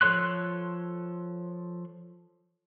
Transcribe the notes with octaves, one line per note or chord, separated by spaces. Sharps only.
F3 A4 C#5 C6 F#6